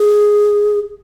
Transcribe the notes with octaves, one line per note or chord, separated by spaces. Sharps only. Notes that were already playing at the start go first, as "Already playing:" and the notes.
Already playing: G#4